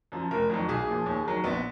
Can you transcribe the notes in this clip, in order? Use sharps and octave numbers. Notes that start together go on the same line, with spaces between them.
F#2 F3
F1 A#4
F2 D#3 F#3
B1 G#4
A#2 F3
D#2
D#3 F#3
A#1 B3